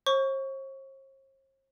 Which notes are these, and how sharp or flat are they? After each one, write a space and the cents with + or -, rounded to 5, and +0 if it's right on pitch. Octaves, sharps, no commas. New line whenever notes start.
C5 +45 C#6 +20